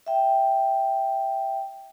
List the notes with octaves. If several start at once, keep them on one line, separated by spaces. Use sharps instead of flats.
E5 G5